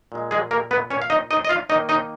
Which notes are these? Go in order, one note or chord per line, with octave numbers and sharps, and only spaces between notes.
A#2 G#3
G#3 G#4
A#3 A#4
B3 B4
C#4 C#5
F5
D#4 D#5
D#4 D#5
D#5
F4 F5
D#3 A#3 D#4 D#5
D#4 D#5